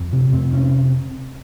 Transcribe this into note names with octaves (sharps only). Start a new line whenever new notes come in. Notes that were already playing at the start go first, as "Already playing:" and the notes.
Already playing: F2
C3
F2 C4
C3 C#4